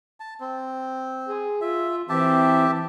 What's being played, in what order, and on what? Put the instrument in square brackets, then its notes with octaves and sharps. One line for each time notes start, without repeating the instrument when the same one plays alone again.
[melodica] A5
C4
[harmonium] G#4
[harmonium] F4 [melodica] E5
[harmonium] E3 C4 [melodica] G4 E5 A5